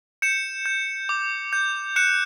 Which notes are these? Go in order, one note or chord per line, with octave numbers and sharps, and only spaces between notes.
G6 C#7 E7
G6
D6
G6
F#6 C#7 E7